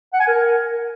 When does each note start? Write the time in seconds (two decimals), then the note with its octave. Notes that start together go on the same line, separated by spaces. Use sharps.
0.13 F#5
0.20 G#5
0.27 A#4